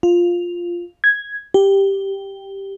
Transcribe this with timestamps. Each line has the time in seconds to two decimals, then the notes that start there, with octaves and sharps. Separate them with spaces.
0.03 F4
1.04 G#6
1.54 G4